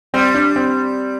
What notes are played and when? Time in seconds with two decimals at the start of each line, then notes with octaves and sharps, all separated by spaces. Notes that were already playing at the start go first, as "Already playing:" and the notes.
0.14 G3 C4
0.35 D4
0.56 C4